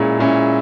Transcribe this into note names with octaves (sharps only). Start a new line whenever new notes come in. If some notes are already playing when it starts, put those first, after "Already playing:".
Already playing: A#2 G#3 C#4 E4
A#2 G#3 C#4 E4